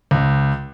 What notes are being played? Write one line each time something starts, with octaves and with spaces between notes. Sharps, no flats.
C#2